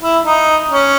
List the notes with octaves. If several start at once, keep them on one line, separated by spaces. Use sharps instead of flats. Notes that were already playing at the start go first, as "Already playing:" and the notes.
E4
D#4
C#4